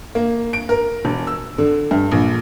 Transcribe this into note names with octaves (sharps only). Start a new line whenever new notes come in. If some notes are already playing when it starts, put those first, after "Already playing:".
A#3
D7
A#4
E1
E6
D3
G2
A#1